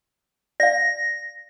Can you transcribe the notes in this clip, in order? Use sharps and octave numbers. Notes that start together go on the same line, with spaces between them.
D5 F5 A#6